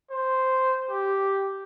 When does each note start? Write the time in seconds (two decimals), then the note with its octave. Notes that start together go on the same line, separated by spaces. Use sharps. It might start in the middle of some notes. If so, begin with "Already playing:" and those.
0.10 C5
0.90 G4